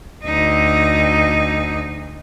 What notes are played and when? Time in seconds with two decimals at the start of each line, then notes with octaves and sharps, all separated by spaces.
0.24 D2 D#4